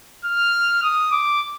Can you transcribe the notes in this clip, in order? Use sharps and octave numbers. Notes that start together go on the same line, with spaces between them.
F6
D#6
D6